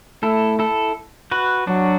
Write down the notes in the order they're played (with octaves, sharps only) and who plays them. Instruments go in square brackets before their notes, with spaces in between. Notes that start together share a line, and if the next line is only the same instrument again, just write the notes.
[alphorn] A3 [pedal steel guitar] E4 A4
[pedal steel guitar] E4 A4
F#4 B4
[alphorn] F#3 [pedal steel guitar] D4 F#4